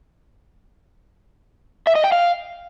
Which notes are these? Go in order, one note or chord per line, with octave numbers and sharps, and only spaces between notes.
E5
D#5
G5
F5